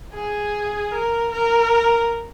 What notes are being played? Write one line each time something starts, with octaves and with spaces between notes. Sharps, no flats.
G#4
A#4
A#4